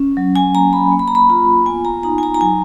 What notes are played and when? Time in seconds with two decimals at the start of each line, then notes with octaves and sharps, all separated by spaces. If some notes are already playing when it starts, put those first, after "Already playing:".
Already playing: C#4
0.17 F#3
0.36 G#5
0.55 A#3 A#5
0.73 B5
0.92 A#3
0.99 B5
1.08 A#5
1.15 B5
1.29 F4 A#5
1.66 B3 G#5
1.85 A#5
2.03 D#4 A#5
2.18 G#5
2.23 A#5
2.34 A#5
2.41 F#3 G#5